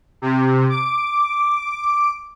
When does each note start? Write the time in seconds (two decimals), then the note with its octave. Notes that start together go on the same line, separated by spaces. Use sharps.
0.22 C3
0.70 D6